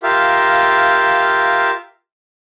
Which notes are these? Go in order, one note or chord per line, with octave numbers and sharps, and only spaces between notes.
F4 G4 A#4 E5 F5